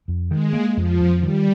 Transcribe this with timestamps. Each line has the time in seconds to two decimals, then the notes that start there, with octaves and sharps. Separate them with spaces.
0.08 F2
0.31 D#3 G#3
0.53 A#3
0.76 F2 F3
1.00 F2
1.22 D#3 G3